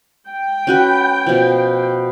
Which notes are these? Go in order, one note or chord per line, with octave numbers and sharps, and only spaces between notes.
G5
C#4 F#4 B4
B2 F3